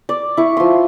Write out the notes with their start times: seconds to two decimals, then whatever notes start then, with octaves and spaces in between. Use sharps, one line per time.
0.09 D5
0.37 E4 C#6
0.57 F3 C6